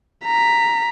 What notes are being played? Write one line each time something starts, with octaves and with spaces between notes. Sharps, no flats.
A#5 B6